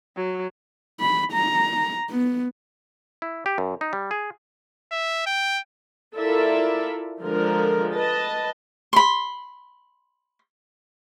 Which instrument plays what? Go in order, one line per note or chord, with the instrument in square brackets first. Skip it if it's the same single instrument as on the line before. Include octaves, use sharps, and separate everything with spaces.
[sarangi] F#3
[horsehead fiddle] B5
A#5
B3
[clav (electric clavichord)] E4
G4
F#2
D#4
G3
G#4
[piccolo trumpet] E5
G5
[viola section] E4 F4 A4 A#4 D5 E5
D3 F3 G#3 A#4
B4 D#5 A5
[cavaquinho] B5 C6